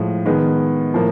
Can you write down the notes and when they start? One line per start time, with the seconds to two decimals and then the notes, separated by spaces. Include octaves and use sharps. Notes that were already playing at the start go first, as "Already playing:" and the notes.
Already playing: A2 F3 G#3
0.26 D#3 G#3 B3
0.94 A2 F3 A#3